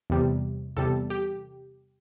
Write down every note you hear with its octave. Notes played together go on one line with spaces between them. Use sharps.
E2 C3 G3
E2 C3 G3 A4
G4